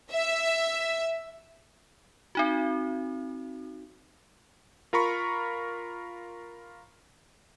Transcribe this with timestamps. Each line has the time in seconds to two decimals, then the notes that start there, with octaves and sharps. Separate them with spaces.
0.11 E5
2.35 C4 D#4 F#4
4.93 F4 A#4 A#5 B5 C#6